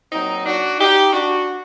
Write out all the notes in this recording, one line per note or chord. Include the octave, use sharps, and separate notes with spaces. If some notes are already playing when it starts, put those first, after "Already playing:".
A#2 F#3 C4 D#4
D4 F#4
D#4 G4
D4 F#4